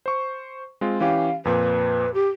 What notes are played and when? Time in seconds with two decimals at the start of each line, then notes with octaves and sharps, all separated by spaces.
0.06 C5 C#6
0.81 G#3 C4 F4
1.00 E3 C#4 G4 F5
1.45 F2 A#2 B4
2.14 G4